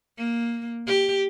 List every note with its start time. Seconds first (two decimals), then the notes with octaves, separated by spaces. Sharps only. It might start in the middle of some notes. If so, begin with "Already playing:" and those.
0.18 A#3
0.86 G4